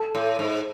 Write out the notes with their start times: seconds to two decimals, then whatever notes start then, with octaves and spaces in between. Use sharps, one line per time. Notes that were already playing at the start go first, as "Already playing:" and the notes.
Already playing: A4
0.15 A2
0.39 G#2